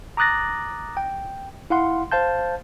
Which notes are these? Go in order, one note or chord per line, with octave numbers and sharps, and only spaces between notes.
A#5 D6 D#6 F#6 A6 A#6
G5
E4 F5 F#5 C6
C5 F5 A5 G6